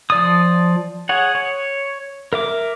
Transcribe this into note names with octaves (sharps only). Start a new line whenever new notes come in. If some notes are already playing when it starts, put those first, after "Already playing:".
F3 D5 D#6
G#4 C#5 F#5
C#5
A#4 E5 D6